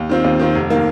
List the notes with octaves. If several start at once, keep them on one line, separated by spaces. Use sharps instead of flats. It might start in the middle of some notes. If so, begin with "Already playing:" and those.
Already playing: D#2
D#3 C4 F4
D#2
D#3 C4 F4
F1
D#3 A#3